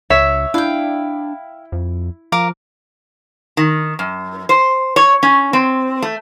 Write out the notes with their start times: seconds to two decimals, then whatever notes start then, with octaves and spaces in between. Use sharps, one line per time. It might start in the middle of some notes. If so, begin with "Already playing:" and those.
0.10 C#2 C#5 E5
0.54 D4 E4 F5 G5
1.72 F2
2.32 F3 A#4 F5 D6
3.57 D#3
3.99 F#2
4.49 C5
4.96 C#5
5.23 C#4
5.53 C4
6.02 A3